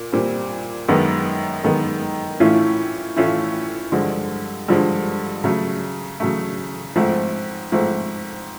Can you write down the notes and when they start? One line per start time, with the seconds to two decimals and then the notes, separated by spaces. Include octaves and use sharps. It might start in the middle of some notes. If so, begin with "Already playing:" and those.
Already playing: A#2
0.12 A#2 G3 C4
0.89 F#2 D#3 G#3 B3
1.64 F#2 D#3 G#3 B3
2.40 A2 E3 A3 C#4 F4
3.16 A2 E3 A3 C#4 F4
3.92 G2 D3 F3 G#3
4.68 G2 D3 F3 G#3
5.44 C#3 F#3 A3
6.20 C#3 F#3 A3
6.96 G#2 F3 A3 C4
7.72 G#2 F3 A3 C4